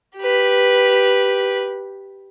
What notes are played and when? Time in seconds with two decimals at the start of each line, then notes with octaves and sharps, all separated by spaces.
0.18 G4 B4